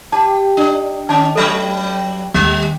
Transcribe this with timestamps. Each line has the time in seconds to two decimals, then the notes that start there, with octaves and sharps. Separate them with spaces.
0.12 G4 A5
0.57 D4
1.09 D#3 C#4 A5
1.35 G2 F#3 A4 C#5
2.34 D#2 G3